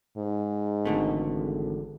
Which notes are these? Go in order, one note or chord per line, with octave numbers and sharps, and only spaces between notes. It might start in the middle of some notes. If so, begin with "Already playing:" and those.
G#2
G#1 E2 D3 A3